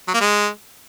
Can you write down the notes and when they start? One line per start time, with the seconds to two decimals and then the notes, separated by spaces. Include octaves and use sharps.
0.08 F#3
0.14 A#3
0.20 G#3